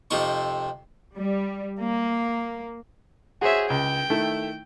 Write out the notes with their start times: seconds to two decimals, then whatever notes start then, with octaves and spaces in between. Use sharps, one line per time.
0.10 F2 C3 F3 D#4 C#6
1.18 G3
1.80 A#3
3.41 F#4 G#4 C5 C#5 E5
3.70 C#2 G5
4.10 D#3 A3 E4